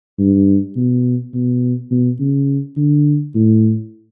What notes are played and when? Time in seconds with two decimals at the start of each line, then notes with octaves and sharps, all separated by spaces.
0.19 G2
0.76 B2
1.34 B2
1.91 B2
2.20 C#3
2.77 D3
3.34 A2